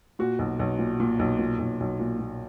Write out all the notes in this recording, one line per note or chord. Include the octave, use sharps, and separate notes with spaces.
A#2 F#4
B1
B1
A#2
A#2
B1
A#2
B1
B1
A#2
A#2